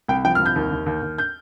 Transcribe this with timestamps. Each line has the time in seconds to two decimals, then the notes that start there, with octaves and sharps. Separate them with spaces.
0.09 C2 G5
0.24 F3 G5
0.35 C2 F6
0.46 G6
0.56 D#2
0.71 D#2
0.86 D#2
1.02 D#2
1.18 G6